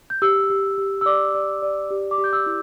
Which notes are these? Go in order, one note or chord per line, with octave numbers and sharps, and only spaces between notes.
G6
G4 E6
G4
G4
E6
D5 D6
D5
D5
G4
D6
G4
G6
E6
E4